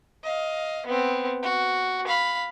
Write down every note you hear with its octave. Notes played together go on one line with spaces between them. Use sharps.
D#5 F5
B3 C4
F#4
F5 B5